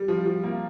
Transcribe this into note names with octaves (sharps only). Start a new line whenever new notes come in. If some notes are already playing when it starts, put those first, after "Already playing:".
Already playing: G3
F3
F3
A#3